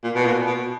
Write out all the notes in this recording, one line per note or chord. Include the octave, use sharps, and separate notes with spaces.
A#2
B2
A#2
B2